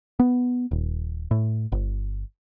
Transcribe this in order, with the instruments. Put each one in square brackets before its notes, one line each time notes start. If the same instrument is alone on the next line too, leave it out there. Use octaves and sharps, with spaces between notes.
[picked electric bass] B3
D#1
A2
G1